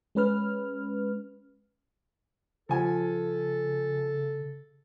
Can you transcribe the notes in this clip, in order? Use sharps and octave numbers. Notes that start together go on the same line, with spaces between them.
G#3 C#4 B4 F6
C#3 F3 A4 G#5